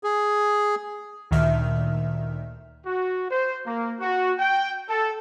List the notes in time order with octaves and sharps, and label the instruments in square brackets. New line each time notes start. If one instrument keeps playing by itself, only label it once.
[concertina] G#4
[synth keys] D2 A#2 D#3 E5 F6
[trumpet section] F#4
C5
A#3
F#4
G5
A4